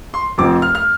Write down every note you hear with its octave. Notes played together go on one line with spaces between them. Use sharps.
C6
F1 F2 F3 C4 D6
F6
F6